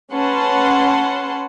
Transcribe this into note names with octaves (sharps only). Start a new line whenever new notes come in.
C#4 B4 F#5 A5 C6